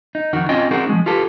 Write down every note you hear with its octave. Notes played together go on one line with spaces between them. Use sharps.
D#4
F2 D#3 F#4
C4 C#4 F4 D#5 G5
C4 D#4 F#4 G#4 A#4
F3 G#3
F4 G4 A4 B4